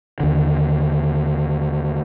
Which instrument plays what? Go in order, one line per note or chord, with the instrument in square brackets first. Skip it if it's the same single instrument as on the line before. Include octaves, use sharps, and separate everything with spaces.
[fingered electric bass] D#2 D3